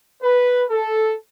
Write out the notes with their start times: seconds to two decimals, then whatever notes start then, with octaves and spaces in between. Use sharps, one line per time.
0.23 B4
0.71 A4